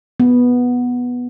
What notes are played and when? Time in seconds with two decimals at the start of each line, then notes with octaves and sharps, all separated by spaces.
0.20 B3